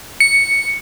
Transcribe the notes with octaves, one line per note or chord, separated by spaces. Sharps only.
C#7